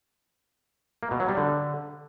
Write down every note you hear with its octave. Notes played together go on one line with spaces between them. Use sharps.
A#3
B2
F#3
G3
D3